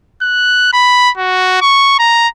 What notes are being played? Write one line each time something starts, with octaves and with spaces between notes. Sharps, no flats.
F#6
B5
F#4
C#6
A#5